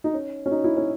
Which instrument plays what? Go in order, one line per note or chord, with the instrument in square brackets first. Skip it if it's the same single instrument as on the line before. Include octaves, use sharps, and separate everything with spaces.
[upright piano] D#4
C#4
C#4
D#4
E4
C#4